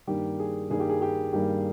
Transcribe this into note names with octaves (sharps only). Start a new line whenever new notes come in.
G2 D#3 G3 A#3 G4
G#4
G2 D#3 G3 A#3 G#4
G4
G#4
G4
G2 D#3 G3 A#3 G4